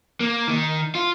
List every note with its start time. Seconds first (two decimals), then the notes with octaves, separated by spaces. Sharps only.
0.21 A#3
0.48 D#3
0.95 F4